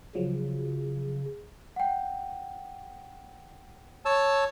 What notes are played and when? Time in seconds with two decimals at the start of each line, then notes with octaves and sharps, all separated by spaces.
0.15 C#3 F3 F#3
1.76 F#5 G5
4.05 C#5 A5 E6